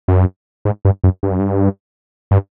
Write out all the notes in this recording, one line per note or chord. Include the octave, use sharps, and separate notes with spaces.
F#2
G#2
G2
F#2
G2
F#2
G2
G2